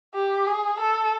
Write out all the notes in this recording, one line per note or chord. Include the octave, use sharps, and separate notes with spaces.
G4
G#4
A4